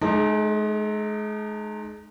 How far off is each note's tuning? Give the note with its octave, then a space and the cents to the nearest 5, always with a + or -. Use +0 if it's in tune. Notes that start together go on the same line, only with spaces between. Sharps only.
G#3 +35 D#4 -25 A4 +0